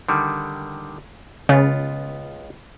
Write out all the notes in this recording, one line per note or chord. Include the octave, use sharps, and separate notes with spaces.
D3 D#3 G3
C#2 C#3 B3 F4